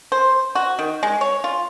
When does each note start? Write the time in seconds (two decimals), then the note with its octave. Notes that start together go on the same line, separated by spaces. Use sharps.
0.12 C5
0.55 F#4
0.79 D#3
1.03 G#3
1.21 C#5
1.44 F4